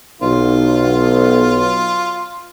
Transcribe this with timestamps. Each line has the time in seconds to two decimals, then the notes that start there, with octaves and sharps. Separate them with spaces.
0.21 B1 F4